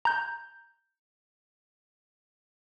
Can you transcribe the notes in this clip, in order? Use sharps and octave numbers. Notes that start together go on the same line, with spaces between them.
A#5 G6